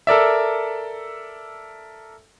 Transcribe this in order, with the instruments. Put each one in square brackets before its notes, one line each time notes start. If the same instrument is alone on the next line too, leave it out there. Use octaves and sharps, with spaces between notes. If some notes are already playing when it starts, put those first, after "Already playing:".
[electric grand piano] A4 A#4 D5 E5